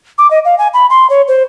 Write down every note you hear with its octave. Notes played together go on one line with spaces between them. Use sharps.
D6
D#5
F5
G#5
B5
C6
C#5
C5